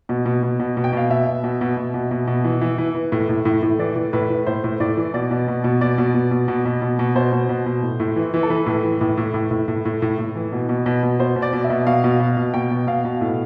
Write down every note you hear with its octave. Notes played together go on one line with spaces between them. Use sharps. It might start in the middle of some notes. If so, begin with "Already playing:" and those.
B2
B2
B2
B2
B2
G5
B2 F5
B2 E5
B2
B2
B2
B2
B2
B2
B2
E3
E3
E3
E3
A2
A2
A2
A2
E3 D5
A2
A2 B4
A2
A2 C5
A2
A2 D5
E3
B2 D5
B2
B2
B2
B2 D5
B2
B2
B2
B2
B2
B2
B2
B2 C5
B2
B2
B2
A2
A2
E3
E3
A4
E3 B4
A2
E3
A2
A2
A2
A2
A2
A2
A2
A2
E3
B2
B2
B2
B2
B2 C5
B2
D5
B2
E5
B2
B2 F5
B2
B2
B2
B2 G5
B2
B2 F5
B2
A2